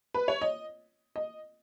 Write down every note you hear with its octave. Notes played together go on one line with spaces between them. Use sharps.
B4
C#5
D#5
D#5